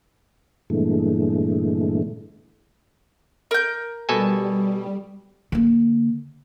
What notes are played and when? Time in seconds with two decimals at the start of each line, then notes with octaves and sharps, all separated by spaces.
0.70 G2 A#2 D3 E3 G#3 A3
3.51 A#4 G6
4.09 B2 G3 A4 G#5
5.52 D3 A#3